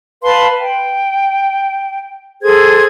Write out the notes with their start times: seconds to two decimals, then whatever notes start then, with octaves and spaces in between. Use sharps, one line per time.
0.24 B4 F5 A5 C6
0.58 G5
2.42 G#4 A4 C5 G#6